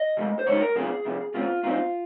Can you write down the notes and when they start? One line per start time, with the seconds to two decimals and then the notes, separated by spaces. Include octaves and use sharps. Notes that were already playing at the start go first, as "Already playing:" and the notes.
Already playing: D#5
0.17 C3 F3 G#3
0.39 C5
0.46 C#3 G#3 D#4 C#5
0.61 A#4
0.75 C#3 F#3 C4 F4 G#4
1.05 C2 C3 F3
1.34 D#2 C#3 G#3 C4 F4
1.63 A#2 F#3 C4 D#4 F4